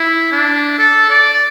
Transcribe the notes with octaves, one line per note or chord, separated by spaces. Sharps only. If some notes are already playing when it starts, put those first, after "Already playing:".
Already playing: E4
D4
A4
D5